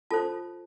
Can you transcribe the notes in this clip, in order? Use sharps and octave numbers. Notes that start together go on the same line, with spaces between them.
F4 A4 C5 A5